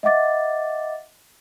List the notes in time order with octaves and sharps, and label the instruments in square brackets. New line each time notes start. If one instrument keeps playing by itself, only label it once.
[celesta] D#5 E5 F#5 D6 A6